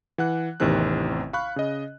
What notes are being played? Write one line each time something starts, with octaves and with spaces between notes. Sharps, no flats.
E3 F#5 F#6
A1 E2 C3 D#3 C4 F#6
F5 B5 C#6 F#6
C#3 D#5